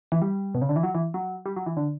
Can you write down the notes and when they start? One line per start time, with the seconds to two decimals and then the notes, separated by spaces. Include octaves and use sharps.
0.12 E3
0.22 G3
0.55 B2
0.62 C#3
0.69 D3
0.76 E3
0.83 F#3
0.95 E3
1.14 F#3
1.46 G3
1.56 F#3
1.66 E3
1.77 D3